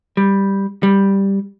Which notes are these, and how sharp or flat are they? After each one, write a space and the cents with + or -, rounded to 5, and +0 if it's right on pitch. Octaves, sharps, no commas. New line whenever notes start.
G3 +5
G3 +5